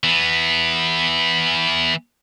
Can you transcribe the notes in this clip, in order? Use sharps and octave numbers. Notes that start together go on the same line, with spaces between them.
E3 B3